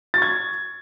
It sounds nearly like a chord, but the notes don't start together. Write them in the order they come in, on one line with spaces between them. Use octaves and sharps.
A6 C#6 G#6